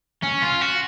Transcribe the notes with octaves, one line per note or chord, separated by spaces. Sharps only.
C#4
F4
F#4